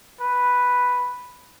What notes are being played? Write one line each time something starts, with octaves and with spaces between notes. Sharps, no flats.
B4